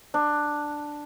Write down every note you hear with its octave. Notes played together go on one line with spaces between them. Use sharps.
D4